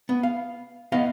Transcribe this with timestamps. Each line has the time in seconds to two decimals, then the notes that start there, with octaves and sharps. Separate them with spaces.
0.09 B3
0.23 F5
0.92 B3 D#5 F5